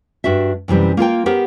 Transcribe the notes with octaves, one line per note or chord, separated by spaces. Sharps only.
G2 D4 F#4 E5
F#2 C3 E3 G3
A#3 F4 A#4 G5
B3 G4 A#4 C5